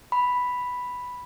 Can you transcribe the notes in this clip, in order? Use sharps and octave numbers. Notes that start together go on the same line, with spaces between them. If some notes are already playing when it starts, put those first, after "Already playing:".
B5